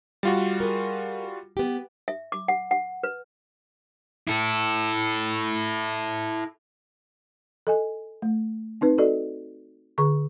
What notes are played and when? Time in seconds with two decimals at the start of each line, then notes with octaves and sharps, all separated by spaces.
0.23 G3 F4 F#4
0.60 G#4 A#4
1.57 B3 G4
2.08 E5
2.32 D6
2.48 F#5
2.71 F#5
3.03 B4
4.28 E4 A4
7.67 A4 D#5 G#5
8.22 A3
8.81 C4 D#4 B4
8.98 F#4 A4 D5 D#5
9.98 D3 G#4 C#6